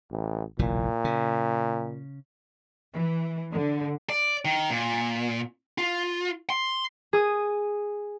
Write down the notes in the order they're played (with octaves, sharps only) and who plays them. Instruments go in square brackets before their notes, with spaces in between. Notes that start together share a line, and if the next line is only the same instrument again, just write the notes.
[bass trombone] A1
[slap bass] F#1 B1 E3 [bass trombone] A#2
[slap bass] C#3
[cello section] E3
D3
[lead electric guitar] D5
D#3
A#2
F4
C6
[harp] G#4 D#6